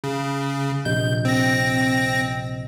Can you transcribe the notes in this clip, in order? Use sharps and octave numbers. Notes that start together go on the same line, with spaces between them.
C#3
A#1 C3 D#5 G6
C4 A#6